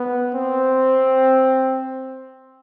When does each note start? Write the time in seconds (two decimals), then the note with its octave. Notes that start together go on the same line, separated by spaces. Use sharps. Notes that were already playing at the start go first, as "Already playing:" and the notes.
Already playing: B3
0.34 C4